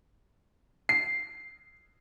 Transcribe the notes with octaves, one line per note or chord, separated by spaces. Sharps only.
C7